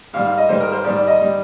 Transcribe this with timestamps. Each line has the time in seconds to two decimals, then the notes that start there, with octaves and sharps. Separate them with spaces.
0.13 G#2 G3 F5
0.26 F5
0.38 D#5
0.49 G#2 G3 C5
0.60 A#4
0.73 C5
0.84 G#2 G3 D5
0.96 D5
1.07 D#5
1.22 G3